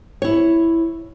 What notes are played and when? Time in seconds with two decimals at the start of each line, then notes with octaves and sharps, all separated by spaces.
0.22 E4 C#5